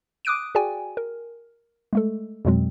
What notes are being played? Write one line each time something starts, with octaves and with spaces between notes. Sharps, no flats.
D6 D#6 F#6 D7 D#7
F#4 G#4 D5 G5 G#5
A#4
G#3 A3 A4
F2 B2 F#3 G#3 C4